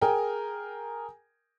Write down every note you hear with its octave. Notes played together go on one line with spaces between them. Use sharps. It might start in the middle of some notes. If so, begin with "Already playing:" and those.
G#4 A#4 G5 G#5